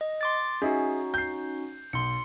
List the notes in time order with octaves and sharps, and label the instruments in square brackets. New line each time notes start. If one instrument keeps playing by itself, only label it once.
[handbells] D#5
C6 D6 A6
[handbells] C#4 D#4 F#4 [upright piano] G#4 D#5 E5
[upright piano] G6 C7
[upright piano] B1 [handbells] C6 C#7